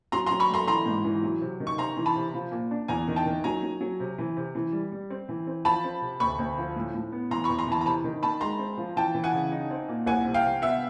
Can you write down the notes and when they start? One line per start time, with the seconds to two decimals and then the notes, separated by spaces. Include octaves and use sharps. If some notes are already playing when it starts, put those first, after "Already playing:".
0.12 F#3 A#5 C6
0.26 A#5 C6
0.31 F#3
0.40 B5 C#6
0.50 A3 A#5 C6
0.67 E3 A#5 C6
0.86 G#2
1.05 E3
1.23 F#3
1.41 C3
1.60 D#3
1.67 C#6
1.78 C3 A#5 C6
1.97 E3
2.06 A5 B5
2.16 C3
2.34 F3
2.52 A#2
2.71 D4
2.88 E2 G#5 A#5
3.08 D#3
3.16 G5 A5
3.26 D#3
3.44 F#3 G#5 A#5
3.63 F#3
3.81 F#3
4.00 C3
4.18 E3
4.37 C3
4.55 E3
4.72 G3
4.92 G3
5.10 C4
5.29 E3
5.47 C4
5.65 F3 A5 B5
5.84 C4
6.01 C3
6.20 D2 B5 C#6
6.39 D2
6.58 F3
6.76 A2
6.94 A2
7.12 B3
7.31 E3 A#5 C6
7.44 B5 C#6
7.49 E2
7.59 A#5 C6
7.67 E3 A5 B5
7.81 A#5
7.85 C3 A5 B5
8.04 D#3
8.23 D#3 A5 B5
8.41 G#3 A#5 C6
8.59 C4
8.78 F3
8.96 E3 G5 A5
9.15 E3
9.24 F#5 G#5
9.33 C#3
9.52 D#4
9.71 C4
9.88 A#2
10.06 C2 F#5 G#5
10.25 C3
10.34 F5 G5
10.44 C3
10.62 B3 E5 F#5